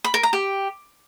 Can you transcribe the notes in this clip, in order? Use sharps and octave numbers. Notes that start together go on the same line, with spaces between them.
B5
A#4
A#5
G4